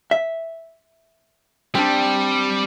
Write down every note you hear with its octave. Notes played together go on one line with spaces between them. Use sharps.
E5
G3 C4 D4